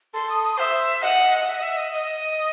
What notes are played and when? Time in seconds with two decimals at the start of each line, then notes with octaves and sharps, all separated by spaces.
0.14 A4 C6
0.30 D#6
0.44 D#6
0.58 C5 E5
1.02 D#5 F#5
1.25 D#5
1.47 E5
1.55 D#5
1.62 E5
1.77 D#5
1.92 D#5